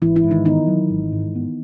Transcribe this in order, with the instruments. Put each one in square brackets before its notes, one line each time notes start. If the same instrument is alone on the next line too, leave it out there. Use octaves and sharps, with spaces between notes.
[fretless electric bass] G#1 [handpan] E3 E4
[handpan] E3 E4
[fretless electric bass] G#2
[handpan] D#3 D#4
[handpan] D#3 D#4 [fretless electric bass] B3
[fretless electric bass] F#3
G#1
G#2
B3